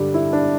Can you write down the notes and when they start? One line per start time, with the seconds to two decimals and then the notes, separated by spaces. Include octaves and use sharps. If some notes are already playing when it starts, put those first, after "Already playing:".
Already playing: G2 D3 G3 G4
0.14 E4
0.33 D4